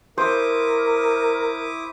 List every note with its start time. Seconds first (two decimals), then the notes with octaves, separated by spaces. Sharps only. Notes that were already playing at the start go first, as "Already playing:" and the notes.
0.18 E4 A#4 C5 D6 D#6